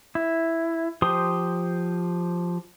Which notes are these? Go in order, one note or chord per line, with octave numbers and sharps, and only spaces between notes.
E4
F3 G4 C5 C6 D#6